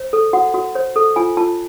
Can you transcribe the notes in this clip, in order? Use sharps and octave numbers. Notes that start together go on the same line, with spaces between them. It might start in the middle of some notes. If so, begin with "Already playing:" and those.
Already playing: C5
A4
F#4 F#5
F#4
C5
A4
F4 G#5
F4 A5